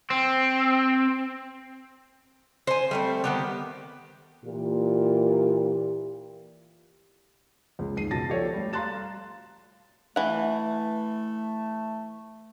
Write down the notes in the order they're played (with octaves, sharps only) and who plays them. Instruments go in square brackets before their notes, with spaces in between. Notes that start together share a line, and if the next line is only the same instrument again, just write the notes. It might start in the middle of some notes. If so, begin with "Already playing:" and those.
[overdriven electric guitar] C4
[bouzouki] C5 G#5
G3 A3 C4
D#3 B3 G4
[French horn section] A#2 E3 G4
[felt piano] C#2
C#2 D#3 C7 D#7
C#2 B2 A5 A6 A#6
F3 G4 A4 C#5 D5
G3 A3
F5 A#5 C6 F#6 A6 E7
[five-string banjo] E3 F#5 [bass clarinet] A3